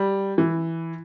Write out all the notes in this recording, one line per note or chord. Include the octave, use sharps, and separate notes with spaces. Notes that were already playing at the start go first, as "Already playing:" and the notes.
Already playing: G3
E3